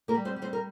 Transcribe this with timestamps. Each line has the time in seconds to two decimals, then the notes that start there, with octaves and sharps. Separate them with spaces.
0.08 A#3 A#4
0.14 G3
0.25 C4 C5
0.36 G3
0.42 C4 C5
0.53 A#4